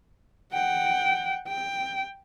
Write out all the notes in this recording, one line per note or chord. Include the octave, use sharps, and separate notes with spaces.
F#5 G5
G5